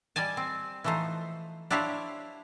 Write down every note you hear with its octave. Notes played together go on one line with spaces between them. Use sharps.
G3 D5 D#5 G#5 A5
C4
E3 F3 A3 D#4 C5
D4 E4 G4 C5 C#5 F5